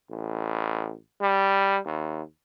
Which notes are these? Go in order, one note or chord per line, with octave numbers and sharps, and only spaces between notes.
A1
G3
D#2